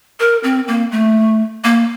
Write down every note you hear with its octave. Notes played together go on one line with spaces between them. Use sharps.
A#4
C4
A#3
A3
A#3